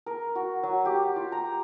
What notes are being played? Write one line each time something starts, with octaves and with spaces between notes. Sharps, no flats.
A#4
F#4
F#3
G4
F4
A#5